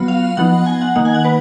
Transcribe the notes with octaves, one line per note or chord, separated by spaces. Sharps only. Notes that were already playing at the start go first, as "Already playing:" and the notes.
Already playing: F#3 B3 F4
F5
F3 B3 D#4 F#5
G#5
F#5
D#3 A#3 D#4 F#5
G#5
F#5
B4